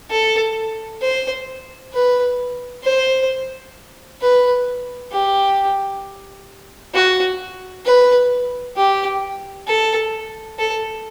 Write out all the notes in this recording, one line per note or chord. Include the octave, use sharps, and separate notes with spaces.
A4
C5
B4
C5
B4
G4
F#4
B4
G4
A4
A4